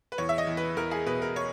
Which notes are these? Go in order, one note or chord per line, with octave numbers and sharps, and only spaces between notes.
B4
E2 C#5
E5
D#5
E2
B4
E2 A#4
G#4
B2 B4
A#4
C#5